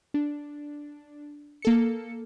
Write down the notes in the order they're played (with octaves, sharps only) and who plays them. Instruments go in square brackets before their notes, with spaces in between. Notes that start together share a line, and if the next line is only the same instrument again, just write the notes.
[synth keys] D4
A#3 A4 C#7